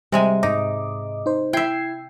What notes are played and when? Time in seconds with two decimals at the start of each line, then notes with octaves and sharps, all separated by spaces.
0.12 C3 G3 G#3 G#5
0.43 G#2 D#4 D#5 D6
1.26 D#4 C5
1.53 E4 E5 G5 G#6 C7